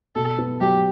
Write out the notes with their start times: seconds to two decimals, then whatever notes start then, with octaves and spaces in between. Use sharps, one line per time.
0.16 B2 A4
0.38 B3
0.61 F#3 G4